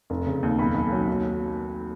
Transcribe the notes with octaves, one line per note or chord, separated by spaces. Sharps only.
F1
C#3
D#2
B1 B5
B1
F#3
D#2